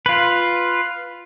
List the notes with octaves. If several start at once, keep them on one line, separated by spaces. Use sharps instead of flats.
F4 B4